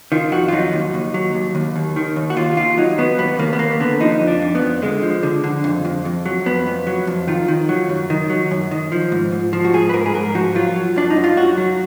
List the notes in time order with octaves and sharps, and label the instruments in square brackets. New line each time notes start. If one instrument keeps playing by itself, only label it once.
[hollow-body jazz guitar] D#3 F4
F2 F#4
F4
F#3 D#4
D#2
D#2
F#3
D#2
D#2
D#2
D#3
D#2
F#4
D#2 F4
D#2 F4
F#3 D#4
F#3 B3
D#2 B3
D#2 A#3
B3
D#2 A#3
D3 B3
F3 D#4
F2
D4
F2
B3
F2
D3 G#3
F3
D3
D3
F2
F2
F2
F#3
F2 B3
F2
F#3
F2
D#3 F4
D#3
F#3
F#2
D#3
F#3
F#2
D#3
F3
G#2
G#2
F3
F#4
G#2 G#4
B4
G#2 A#4
G#4
G#2 A#4
F3 F#4
F#3 F4
F#3
F#2 D4
D#4
F#2
F4
F#2 F#4
F#3